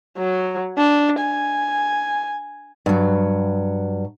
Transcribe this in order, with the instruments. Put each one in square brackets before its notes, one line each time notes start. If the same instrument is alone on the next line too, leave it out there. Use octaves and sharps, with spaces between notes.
[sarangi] F#3
D4
G#5
[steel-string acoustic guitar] G2 F#3